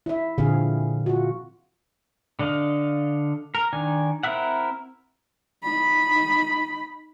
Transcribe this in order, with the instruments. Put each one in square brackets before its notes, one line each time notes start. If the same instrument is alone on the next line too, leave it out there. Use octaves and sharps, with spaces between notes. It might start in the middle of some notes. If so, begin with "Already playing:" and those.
[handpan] E4 E5
A#2 D3 F3 C4 G#4 F5
F4 F#4
[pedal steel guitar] D3 D4 D#5 F5
A#4
D#3 D4 G#5
C4 E4 A#4 E5 F#5
[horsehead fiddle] D#4 B5